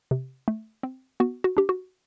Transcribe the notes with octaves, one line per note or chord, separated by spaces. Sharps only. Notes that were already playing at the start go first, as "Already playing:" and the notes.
C3
A3
C4
B3 F#4
F#4
D4 G4
F#4